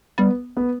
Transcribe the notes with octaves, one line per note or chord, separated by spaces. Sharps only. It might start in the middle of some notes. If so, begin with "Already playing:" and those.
G3 B3
B3